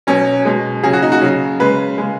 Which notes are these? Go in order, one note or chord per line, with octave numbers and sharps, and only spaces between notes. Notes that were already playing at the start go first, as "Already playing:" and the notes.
B2 F#3 C#4
B2 G#3
C#3 F#3 G#4
F#4
D#4
F#4
C#3 F#3
C#3 G#3 B4
C#3 G#3